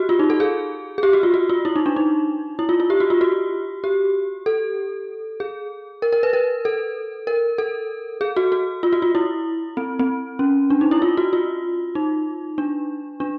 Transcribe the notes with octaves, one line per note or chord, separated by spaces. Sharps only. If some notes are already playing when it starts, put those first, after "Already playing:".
Already playing: F#4 G4
F4
D#4
A4
G#4
G#4
G4
F#4
F4
F#4
F4
E4
D#4
D4
D#4
E4
F4
F4
G4
F#4
F4
F#4
G4
A4
G#4
A#4
A#4
B4
A#4
A4
A#4
A4
G#4
F#4
F#4
F4
F#4
F4
E4
C4
C4
C#4
D4
D#4
E4
F4
F#4
F4
D#4
D4
D4